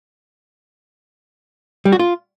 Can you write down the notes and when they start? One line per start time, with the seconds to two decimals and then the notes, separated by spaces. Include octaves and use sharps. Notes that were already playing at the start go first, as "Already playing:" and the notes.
1.85 G3
1.92 F#4
1.99 F4